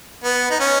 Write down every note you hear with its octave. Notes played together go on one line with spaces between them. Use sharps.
B3
D#4
C#4